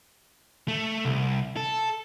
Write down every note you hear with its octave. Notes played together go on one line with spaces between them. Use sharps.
A3
C2
A4